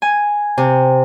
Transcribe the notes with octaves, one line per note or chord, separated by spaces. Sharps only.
G#5
C3